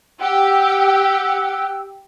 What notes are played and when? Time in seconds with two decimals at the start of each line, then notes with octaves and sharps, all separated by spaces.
0.21 G4 F#5 E6